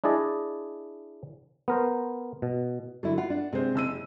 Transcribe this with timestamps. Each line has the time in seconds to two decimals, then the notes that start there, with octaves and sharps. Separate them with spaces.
0.04 D4 E4 G#4 D5 D#5
1.68 B3 A#4 C5
2.42 B2
3.03 D3 F#3 E4
3.18 F4 F#5
3.30 D4
3.53 C3 G#3 C5
3.75 F#1 E6 D#7